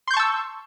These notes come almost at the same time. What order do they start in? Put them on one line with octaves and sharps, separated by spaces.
C6 G6 C#6 A5 E6